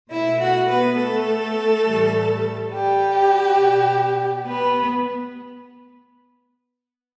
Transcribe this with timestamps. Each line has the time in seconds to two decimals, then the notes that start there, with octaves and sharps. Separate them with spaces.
0.11 B2 A3 E4 E5
0.40 F#4 F#5
0.69 B3 B4
0.98 A3 A4
1.85 A2 E3 G3
2.72 G3 G4
3.59 B2 G3
4.46 B3 B4